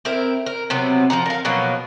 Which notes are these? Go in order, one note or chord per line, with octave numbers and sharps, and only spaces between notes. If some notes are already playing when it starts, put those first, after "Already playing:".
C4 E4 A#4
A#4
C3 F#3 B3 C4
F3 B3 F#5 A#5
A#4 F5
B2 F3 F#3 A#3